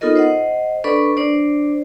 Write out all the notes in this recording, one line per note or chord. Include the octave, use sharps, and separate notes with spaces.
B3 D#4 F4 A4 A#4 D#5
C5 D#5 F#5
D4 A4 B4 D5 B5 C#6
D4 C5 D5